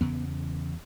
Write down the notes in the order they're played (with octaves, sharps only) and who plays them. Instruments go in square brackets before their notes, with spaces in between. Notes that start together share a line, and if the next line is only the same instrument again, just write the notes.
[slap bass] E2 C#3 B3